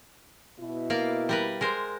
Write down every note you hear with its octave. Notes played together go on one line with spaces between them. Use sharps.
B2 E4
A#3 D5 F5
G3 A#4 B4
G#3 A#4 C5